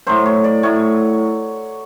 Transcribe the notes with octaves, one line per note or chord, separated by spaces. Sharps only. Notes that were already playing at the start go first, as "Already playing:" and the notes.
A2 F#3 C5
C#5
D5
A2 F#3 C#5